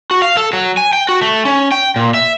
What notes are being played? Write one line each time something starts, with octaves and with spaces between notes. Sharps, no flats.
F#4
F5
A4
F#3
G#5
G5
F#4
A3
C#4
G5
A#2
E5